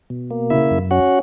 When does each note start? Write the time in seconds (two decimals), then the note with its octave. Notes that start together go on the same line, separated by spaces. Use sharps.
0.10 B2
0.31 A#3
0.50 C#3 E4 E5
0.71 F#2
0.91 C#4 F#4 F#5